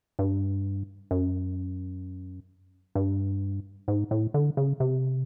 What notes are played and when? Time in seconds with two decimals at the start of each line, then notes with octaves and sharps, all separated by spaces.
0.19 G2
1.11 F#2
2.95 G2
3.88 G#2
4.11 A2
4.34 D3
4.57 C#3
4.80 C3